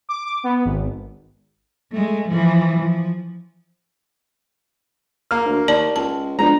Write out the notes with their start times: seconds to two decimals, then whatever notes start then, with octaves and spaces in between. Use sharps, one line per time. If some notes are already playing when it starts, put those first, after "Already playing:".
0.09 D6
0.25 D6
0.44 B3
0.65 G#1
1.92 G#3 A3
2.29 E3 F3
2.79 F3
5.31 A#3 F6
5.45 D2
5.68 D#2 D5 A5
5.96 C#2 A5
6.39 F3 G#3 B3 D4 A#5